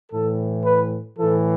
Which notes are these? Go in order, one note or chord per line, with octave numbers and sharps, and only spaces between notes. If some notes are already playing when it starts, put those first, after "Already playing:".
A2 E3 A4
B4
A2 E3 A4